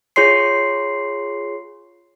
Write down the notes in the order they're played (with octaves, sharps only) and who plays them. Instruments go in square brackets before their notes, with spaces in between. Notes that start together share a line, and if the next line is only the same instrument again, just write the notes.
[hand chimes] F4 G#4 C#5 C6 C7